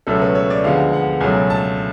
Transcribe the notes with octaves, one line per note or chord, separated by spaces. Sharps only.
C#2 B2 F#3 A3 C#4 A4
B4
C#5
D5
D2 D3 F3 G#3 B3 F5
F#5
C#2 B2 F#3 A3 C#4 G#5
A5